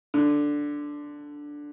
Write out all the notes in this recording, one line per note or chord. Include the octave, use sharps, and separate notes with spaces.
D3